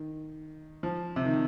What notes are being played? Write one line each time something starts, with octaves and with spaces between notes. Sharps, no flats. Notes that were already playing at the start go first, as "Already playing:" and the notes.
Already playing: D#3
F3
C3
D#3